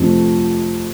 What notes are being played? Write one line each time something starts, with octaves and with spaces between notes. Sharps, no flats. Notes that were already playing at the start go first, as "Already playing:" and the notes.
Already playing: F2 C3 F3 A3